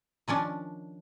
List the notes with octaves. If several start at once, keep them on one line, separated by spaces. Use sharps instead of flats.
D#3 F3 C#4 D4